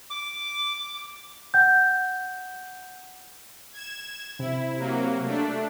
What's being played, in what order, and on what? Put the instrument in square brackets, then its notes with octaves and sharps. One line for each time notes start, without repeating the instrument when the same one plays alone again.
[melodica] D6
[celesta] F#5 G5 G6
[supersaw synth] G#6 E7
[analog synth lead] C3 [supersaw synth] E4
[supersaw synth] F#3 A#3
A3 D4